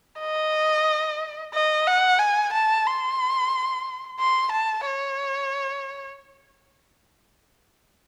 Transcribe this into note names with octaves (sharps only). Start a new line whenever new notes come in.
D#5
D#5
F#5
G#5
A5
C6
C6
A5
C#5